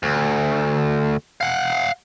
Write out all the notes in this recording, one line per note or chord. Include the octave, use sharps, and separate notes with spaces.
D2
F5 F#5